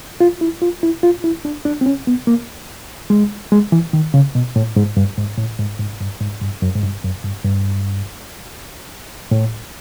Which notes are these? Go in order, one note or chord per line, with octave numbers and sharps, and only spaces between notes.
F4
E4
F4
E4
F4
E4
D4
D4
C4
C#4
B3
A#3
G#3
G#3
E3
D#3
C#3
B2
A2
G#2
G2
G#2
A2
G#2
G#2
G2
G#2
G2
F#2
G#2
G2
F#2
G2
G2
A2